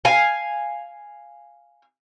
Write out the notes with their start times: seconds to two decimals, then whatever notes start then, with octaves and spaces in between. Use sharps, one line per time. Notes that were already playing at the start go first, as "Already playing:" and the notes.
0.05 F5 G#5